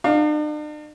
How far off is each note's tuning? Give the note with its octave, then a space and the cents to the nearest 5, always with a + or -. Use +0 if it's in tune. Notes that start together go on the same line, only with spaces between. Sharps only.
D4 +45 F5 +20